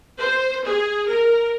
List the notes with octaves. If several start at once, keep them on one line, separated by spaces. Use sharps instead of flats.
C5
G#4
A#4